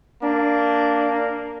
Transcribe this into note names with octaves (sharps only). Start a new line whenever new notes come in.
A#3 D4